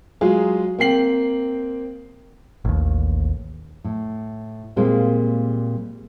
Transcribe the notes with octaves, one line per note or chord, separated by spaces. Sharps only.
F#3 G#3 F4 G#4
A#3 C4 G5 C7 F#7
A1 D#2
A2
A#2 G3 G#3 A#3 C4